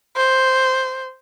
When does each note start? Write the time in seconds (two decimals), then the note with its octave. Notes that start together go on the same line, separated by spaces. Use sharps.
0.16 C5